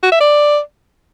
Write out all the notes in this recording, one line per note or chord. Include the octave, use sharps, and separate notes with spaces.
F#4
E5
D5